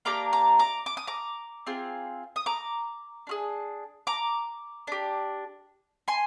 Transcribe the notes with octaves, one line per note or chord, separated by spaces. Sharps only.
A#3 D4 G4 A#5 D6
A#5 D6
A#5 D6
D6
D#6
A#5 D6
C4 F4 G#4
D#6
A#5 D6
D4 F4 G#4
A#5 D6
D4 G4
G#5 C6